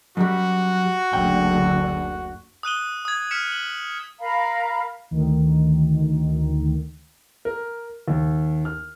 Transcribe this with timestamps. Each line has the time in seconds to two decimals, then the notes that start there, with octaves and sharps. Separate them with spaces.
0.17 F#2 G3 F#4
1.13 F#1 D2 D3 G5
2.63 D#6 F#6 D#7 G7
3.05 D#6 G#6
3.31 F6 B6 C#7 E7
3.52 F#7
4.20 A#4 F5 A#5 B5
5.11 D2 D#3
7.45 A#4
8.08 D#2
8.65 F6